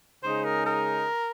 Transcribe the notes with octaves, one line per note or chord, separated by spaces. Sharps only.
C#3 G#3 D#4 G#4 C5
A#4
A#4